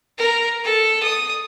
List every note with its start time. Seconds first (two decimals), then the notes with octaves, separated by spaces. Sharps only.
0.18 A#4
0.65 A4
1.02 D#6